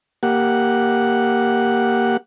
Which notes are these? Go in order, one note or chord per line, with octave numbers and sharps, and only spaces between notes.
A#3 G4 F#5